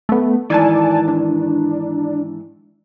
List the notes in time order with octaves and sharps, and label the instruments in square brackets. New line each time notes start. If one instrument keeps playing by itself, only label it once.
[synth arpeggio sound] A3 B3
[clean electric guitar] G#2 D#3 E3 [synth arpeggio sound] D5 G#5 A5
[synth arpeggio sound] D4